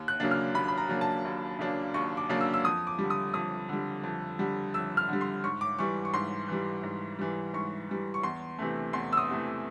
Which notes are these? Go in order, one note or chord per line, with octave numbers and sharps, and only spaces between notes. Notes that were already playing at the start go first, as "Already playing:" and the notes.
Already playing: D#2
F#6
C#3 F#3 A#3 D4
F6
D#2 B5
B5
A#5
C#3 F#3 A#3 D4
A5
D#2
C#3 F#3 A#3 D4
D#2 C#6
D6
C#3 F#3 A#3 D4
E6
E6
F2 D#6
D6
G3
D3
D#6
F2 D#6
D3 G3
F2
D3 G3
F2 E6
F6
D3 G3
C6
G#2 C#6
D6
E3 G3 C#6
C#6
G#2 C6
E3 G3
G#2
E3 G3
G#2 C#6
E3 G3
C#6
E2 C6
C3 E3 A3
E2 C6
E6
D#6
C3 E3 A3